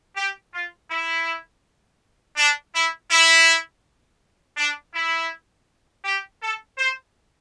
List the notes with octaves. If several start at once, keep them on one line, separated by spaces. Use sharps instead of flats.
G4
F4
E4
D4
E4
E4
D4
E4
G4
A4
C5